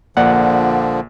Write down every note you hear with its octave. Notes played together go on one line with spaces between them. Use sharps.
A#1 D3 F3 A#3 D5 F#5